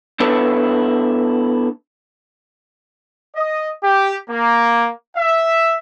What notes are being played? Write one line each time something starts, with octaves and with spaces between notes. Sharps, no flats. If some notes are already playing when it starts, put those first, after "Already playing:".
B3 D4 E4 A4 B4 C#5
D#5
G4
A#3
E5